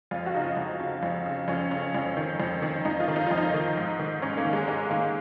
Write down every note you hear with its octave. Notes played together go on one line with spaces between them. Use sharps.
F2 F4
F#4
C#3 D#4
F4
F2
C#3
F2
C#3
F2 C#4
C#3 C#4
F2
D#3
F2
D#3
F2 D#4
F4
D#3
D#4
F2 F4
D#4
D#3
G#2
D#3
G#2 C#4
A#3
D#3
G#3
G#2 G#3
D#3 A#3